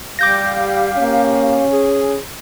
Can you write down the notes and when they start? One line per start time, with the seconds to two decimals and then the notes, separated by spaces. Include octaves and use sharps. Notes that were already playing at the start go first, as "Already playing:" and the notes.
0.19 G3 G4 F5 D6 G6 A#6
0.96 A#3 C#4
1.71 G#4